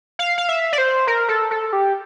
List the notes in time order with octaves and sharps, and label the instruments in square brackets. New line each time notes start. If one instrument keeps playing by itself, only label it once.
[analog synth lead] F5
F5
E5
D5
C5
A#4
A4
A4
G4